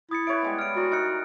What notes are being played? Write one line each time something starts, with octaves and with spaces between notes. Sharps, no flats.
E4 D#6 A6 C#7
B4 C#5 E5 D7
G3 G#3 B3
F6 D7
F#4 A#4 D5
D#4 F6 F#6 C#7